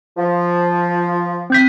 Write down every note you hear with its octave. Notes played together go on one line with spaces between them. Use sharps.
F3
C4 G6 B6